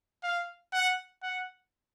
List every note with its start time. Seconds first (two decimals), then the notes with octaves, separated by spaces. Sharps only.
0.24 F5
0.73 F#5
1.23 F#5